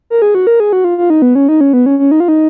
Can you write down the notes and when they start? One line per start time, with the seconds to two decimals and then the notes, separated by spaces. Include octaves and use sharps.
0.10 A#4
0.22 G#4
0.35 F#4
0.47 A#4
0.60 G#4
0.73 F#4
0.84 F4
0.98 F4
1.10 D#4
1.22 B3
1.35 C#4
1.48 D#4
1.61 C#4
1.73 B3
1.86 C#4
1.99 C#4
2.11 D#4
2.20 F4
2.28 D#4